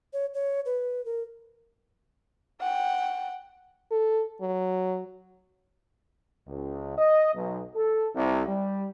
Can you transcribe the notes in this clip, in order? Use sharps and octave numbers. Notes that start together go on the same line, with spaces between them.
C#5
C#5
B4
A#4
F#5 G5
A4
F#3
C#2
D#5
B1
A4
C2
G3